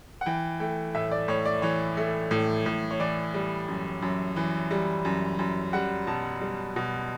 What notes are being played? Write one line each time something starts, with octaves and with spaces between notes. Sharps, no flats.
F#5
E3 G5
A3 G5
A2 E5
D5
A2 C#5
D5
E3 C#5
A3
A2
A2
C#5
E3 D5
G3
F#2
F#2
E3
G3
F#2
F#2
G3 F#5
B2 A5
G3
B2